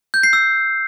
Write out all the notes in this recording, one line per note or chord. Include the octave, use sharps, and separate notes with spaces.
G6
C7
E6